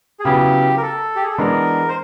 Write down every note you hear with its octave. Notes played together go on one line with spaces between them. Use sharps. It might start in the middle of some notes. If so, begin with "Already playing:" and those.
G#4
C#3 F#3 B3 E4 G4
A#4
A4
G4
G#4
A4
E3 G#3 B3 D4 A#4
C5